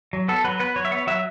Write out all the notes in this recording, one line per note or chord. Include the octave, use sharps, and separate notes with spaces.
F#3
B3 A4
F#3 B4
B3 B4
F#3 C#5
E5
B3 C#5
F#3 E5